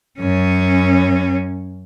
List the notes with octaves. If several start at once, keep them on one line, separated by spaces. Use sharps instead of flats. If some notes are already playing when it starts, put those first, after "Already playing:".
F#2 C#4